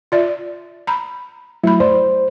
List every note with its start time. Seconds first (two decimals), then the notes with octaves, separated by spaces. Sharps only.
0.12 F4 D5 E5
0.87 A#5 B5
1.64 F#3 A3 E4 B5
1.80 C5 D5